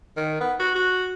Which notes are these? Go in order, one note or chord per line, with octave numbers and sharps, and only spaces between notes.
D#3
B3
F#4
F#4